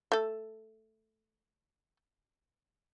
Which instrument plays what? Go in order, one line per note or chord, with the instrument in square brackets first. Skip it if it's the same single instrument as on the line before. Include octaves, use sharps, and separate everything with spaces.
[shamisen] A3 A4